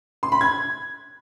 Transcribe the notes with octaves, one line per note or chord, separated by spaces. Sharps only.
C6
B5
G#6